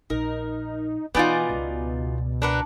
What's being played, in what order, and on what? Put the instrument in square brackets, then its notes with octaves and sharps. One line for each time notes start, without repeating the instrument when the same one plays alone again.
[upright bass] A#1 [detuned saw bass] D#4 [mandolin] A#4
[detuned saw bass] B2 [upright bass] E3 [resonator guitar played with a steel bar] B3 D#4 F4 [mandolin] D5 G#5 D6
[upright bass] C#2
[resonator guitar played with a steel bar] D4 [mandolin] A#4 B4 F#5